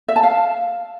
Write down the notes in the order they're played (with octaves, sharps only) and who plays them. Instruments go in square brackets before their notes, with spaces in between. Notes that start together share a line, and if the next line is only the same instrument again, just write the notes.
[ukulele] E5
A5
F5